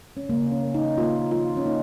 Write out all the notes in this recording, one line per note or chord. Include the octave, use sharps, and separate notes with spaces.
C#4
C#3 A#3
C#4
A#3
D#4
A#3 F4
A#3 F4
C#4
A#3 D#4